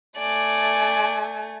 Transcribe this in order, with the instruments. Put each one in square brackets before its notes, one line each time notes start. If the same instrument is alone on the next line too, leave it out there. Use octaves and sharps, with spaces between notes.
[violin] A3 G#5 [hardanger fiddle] D5